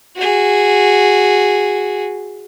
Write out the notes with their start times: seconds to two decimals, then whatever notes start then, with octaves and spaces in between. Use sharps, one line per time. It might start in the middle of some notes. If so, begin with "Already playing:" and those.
0.17 F#4 G#4